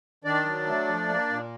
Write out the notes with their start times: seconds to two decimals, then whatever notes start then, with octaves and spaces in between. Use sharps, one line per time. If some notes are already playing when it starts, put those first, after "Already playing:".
0.24 D#3 D4 D5
0.45 F#3
0.67 A3
0.88 F3
1.09 A#3
1.29 A#2